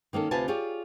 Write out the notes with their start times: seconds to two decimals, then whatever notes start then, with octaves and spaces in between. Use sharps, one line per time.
0.13 D#3 A#3 C#4 A4
0.31 D2 C3 F4 B4 G#5 A5
0.48 F4 G4 G#4 C#5 D5